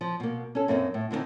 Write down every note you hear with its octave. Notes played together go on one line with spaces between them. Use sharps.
F3
B2 A#3
C#4 A4
F#2 A#3 C4 D4 D#4
A2
D3 E3 B3 C4 D#4